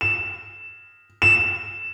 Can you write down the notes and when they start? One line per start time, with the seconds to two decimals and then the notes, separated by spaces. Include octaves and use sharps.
0.01 E7
1.22 E7